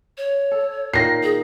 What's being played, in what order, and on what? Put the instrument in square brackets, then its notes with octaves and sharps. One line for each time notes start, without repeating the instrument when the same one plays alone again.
[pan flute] C#5
[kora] A4
[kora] A#2 D#3 [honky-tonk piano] A#6 C7
[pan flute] G#4